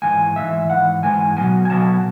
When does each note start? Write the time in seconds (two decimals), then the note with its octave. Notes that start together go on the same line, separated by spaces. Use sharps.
0.02 G#2 E3 G#3 G#5
0.36 G#2 E3 E5
0.70 G#2 E3 F#5
1.03 G#2 E3 G#3 G#5
1.37 B2 F#3 B3 G#5
1.65 G#5
1.70 B2 F#3 B3 A5